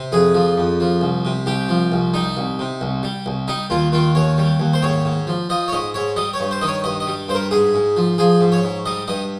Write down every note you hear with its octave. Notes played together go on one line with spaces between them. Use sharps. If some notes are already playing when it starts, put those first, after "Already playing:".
Already playing: C3
F2 G#4
F3
F2
F3
C2
C3
C2 G4
F3
C2
G3 D#4
C2
C3
C2
G3
C2
G3 D#4
D#2 F4
D#3 F4
D#2 C#5
G3
D#2
C5
G#2 C#5
G#2
F3
F3 D#5
C#5
G#2 D#5
G#2 C#5
G3 D#5
C#5
G2
C5
D#3 D#5
C#5
G2 D#5
D#5
G3
G2 C5
A#4
G#2 G#4
G#2
F3
F3 G#4
G#2
C#5
G#2
G3 D#5
G2 D#5